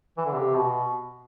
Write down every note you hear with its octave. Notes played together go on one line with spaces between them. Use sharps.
E3
D3
C3
B2